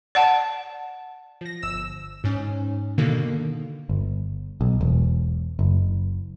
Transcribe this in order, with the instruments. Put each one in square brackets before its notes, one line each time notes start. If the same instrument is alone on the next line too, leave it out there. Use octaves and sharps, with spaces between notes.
[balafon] D5 F#5 A5
[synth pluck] F3 A#6
G1 E6 E7
G#2 C#4
B2 D3 D#3 A#3
[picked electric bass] G1
B1
E1
F#1